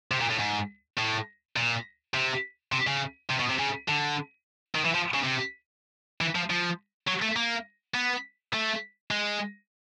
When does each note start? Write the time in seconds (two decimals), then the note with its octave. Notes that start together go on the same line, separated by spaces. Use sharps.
0.11 C3
0.21 A#2
0.31 A2
0.40 G#2
0.98 A2
1.56 A#2
2.14 C3
2.72 C3
2.87 C#3
3.30 C3
3.40 B2
3.50 C3
3.59 C#3
3.89 D3
4.75 D#3
4.85 E3
4.95 F3
5.14 C#3
5.24 C3
6.21 E3
6.35 F3
6.50 F3
7.08 F#3
7.22 A3
7.36 A#3
7.95 B3
8.53 A3
9.11 G#3